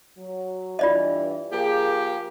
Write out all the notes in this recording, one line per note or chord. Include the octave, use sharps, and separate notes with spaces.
F#3
G2 E3 F4 D5 D#5
F3 A#3 G4 G#4